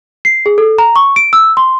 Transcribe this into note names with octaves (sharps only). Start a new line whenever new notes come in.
C7
G#4
A4
A#5
C#6
D7
E6
C6